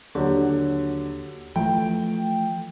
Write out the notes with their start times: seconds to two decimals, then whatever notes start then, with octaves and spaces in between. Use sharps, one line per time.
0.15 D#2 D3 F#3 G4 C#5 F#5
1.56 E3 F3 A3 G5